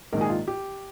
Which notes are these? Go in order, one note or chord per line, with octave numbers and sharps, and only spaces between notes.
A#1 G#2 D#3 A#4
G#4
F4
G4